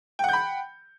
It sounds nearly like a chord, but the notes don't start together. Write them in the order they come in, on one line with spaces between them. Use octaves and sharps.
G5 F#5 G6 B5